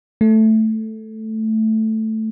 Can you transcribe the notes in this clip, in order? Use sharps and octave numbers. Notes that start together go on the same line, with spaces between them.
A3